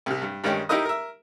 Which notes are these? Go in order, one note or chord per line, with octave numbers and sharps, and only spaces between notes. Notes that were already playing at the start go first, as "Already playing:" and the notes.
C2 C3
G2
G2 D#3 G3 G#3 C#4 G4
D#4 E4 G4 A#4 D#5
A#4 E5